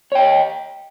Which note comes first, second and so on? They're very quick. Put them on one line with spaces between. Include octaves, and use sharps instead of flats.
C#5 G5 D#5